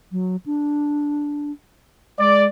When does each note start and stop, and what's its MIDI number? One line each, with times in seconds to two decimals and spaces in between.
0.12 0.36 54
0.46 1.52 62
2.19 2.47 56
2.19 2.46 74